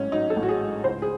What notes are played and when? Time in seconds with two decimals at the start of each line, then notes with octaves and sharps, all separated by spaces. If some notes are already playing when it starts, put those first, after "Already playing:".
Already playing: A1 G#2 F#3 C#4
0.12 F#3 D#4
0.30 A4
0.37 A1
0.43 F#4
0.49 G#4
0.61 G#2
0.84 C#2 C5
1.02 G#4